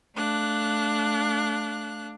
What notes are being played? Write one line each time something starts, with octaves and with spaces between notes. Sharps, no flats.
A3 D4 F5 F#6